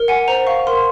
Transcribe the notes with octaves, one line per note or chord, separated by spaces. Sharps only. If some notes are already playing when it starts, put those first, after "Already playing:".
Already playing: A#4
F#5 G#5
C5 A#5
F5 C#6
A#4 C6